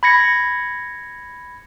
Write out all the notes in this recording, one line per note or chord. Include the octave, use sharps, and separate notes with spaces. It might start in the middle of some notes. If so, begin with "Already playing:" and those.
B5 G#6 A#6 C#7